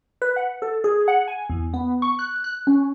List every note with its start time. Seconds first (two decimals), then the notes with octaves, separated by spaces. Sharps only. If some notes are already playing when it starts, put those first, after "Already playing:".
0.22 B4
0.36 F#5
0.62 A4
0.84 G#4
1.08 F#5
1.28 G#5
1.50 E2
1.74 B3
2.02 C#6
2.19 F#6
2.44 F#6
2.67 C#4